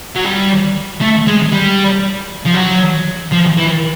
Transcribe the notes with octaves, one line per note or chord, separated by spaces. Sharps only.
F#3
G3
A3
G#3
G3
F3
F#3
F3
E3